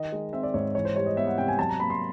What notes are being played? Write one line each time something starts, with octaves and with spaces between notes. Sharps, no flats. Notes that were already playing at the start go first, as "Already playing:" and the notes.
Already playing: D#3 D#5
G#3
C4 E5
D5
G#2 C#5
E3 C#5
C5
G3 C#5
D#5
B3 E5
F#5
C3 G5
G#5
F#3 A5
A#5
A#3 B5
C6